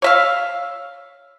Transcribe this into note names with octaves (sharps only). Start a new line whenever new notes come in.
C#5 E5 F5